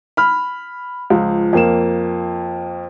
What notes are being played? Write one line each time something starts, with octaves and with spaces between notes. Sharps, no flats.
B5 F6
C#2 F3
F2 A#3 E7